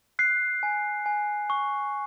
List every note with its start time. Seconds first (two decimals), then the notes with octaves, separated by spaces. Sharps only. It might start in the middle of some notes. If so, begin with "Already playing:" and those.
0.19 F#6 C7
0.63 G#5
1.06 G#5
1.50 C#6